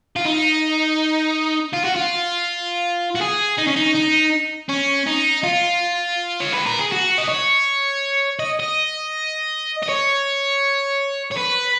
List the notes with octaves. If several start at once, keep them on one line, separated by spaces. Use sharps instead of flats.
F4
D#4
F4
F#4
F4
F#4
G#4
D#4
C#4
D#4
D#4
C#4
D#4
F4
C#5
B4
A#4
G#4
F#4
D#5
C#5
D#5
D#5
D#5
C#5
C#5
B4